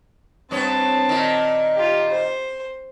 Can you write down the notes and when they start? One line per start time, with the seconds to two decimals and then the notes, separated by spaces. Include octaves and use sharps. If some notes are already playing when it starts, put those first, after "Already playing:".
0.51 G2 B3 C4 C#5 A5
1.09 A#2 D#3
1.75 F4 G4
2.09 C5